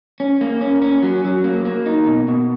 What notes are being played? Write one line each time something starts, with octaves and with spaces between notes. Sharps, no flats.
C#4
A#3
C#4
C#4
F#3
F#3
A#3
A#3
D#4
B2
B2